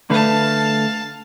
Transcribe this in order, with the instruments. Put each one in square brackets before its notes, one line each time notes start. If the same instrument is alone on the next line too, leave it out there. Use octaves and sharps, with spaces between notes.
[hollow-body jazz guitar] D3 A3 B4 [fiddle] F5 A5